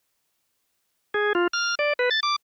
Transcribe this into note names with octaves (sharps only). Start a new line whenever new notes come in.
G#4
F4
F6
D5
B4
A6
D6